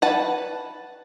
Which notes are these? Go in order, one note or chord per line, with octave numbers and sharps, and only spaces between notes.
B4 F#5 A5